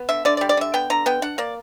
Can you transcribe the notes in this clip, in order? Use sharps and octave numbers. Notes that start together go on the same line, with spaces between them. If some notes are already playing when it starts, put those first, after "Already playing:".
Already playing: B3
D3 E5
D3 D5
D5
G3
D5
D3 E5
B3 G5
D3 A#5
B3 G5
D4 F#5
A#3 D5